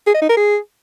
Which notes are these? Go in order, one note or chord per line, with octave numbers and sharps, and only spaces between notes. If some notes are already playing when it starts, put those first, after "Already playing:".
G#4
D#5
D#4
A#4
G#4